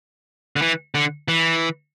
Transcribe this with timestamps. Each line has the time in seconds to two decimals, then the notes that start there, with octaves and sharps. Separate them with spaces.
0.56 D3
0.62 E3
0.95 D3
1.28 E3